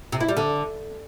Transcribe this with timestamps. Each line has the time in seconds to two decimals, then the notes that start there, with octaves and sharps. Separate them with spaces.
0.12 C3
0.20 E4
0.29 G3
0.37 D3